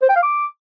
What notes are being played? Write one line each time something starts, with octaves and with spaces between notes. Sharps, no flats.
C5
G5
F5
D6